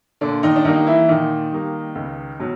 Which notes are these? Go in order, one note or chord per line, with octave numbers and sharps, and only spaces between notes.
A#2 D3 D4
D#3 D#4
D4
D#3 G3 A#3 D#4
E3 E4
A#2 D#3 D#4
G3 A#3
C#2
B2 F#3